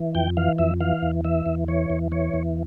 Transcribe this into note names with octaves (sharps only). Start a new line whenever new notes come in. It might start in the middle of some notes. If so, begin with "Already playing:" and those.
Already playing: E3
F2 G5
E3 F5
F2 E5
E3 F5
E2
E3 E5
E2
E3 C#5
E2
E3 C#5
E2